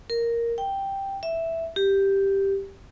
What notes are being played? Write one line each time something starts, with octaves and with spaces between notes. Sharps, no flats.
A#4
G5
E5
G4